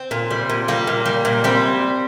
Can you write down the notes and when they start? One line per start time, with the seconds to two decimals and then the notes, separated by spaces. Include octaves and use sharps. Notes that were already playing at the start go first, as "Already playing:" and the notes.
Already playing: C4
0.11 A#2
0.31 G3
0.49 A#2
0.68 G3 A#3
0.87 A#2
1.06 G3
1.25 A#2
1.44 G3 C4